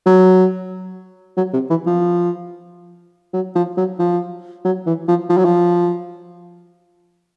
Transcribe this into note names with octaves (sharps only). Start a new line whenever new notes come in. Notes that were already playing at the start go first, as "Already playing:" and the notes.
F#3
F#3
C3
E3
F3
F#3
F3
F#3
F3
F#3
E3
F3
F3
F#3
F3